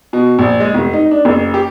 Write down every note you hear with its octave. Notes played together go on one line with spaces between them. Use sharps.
B2
A#1
G#3
F1
D#4
D4
F#1
G4